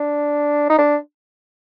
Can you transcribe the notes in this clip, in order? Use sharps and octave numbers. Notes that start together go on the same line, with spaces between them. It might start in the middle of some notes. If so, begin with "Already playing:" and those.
Already playing: D4
D#4
D4